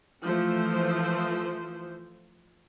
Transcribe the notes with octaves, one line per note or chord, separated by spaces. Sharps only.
E3 F3 A3 C5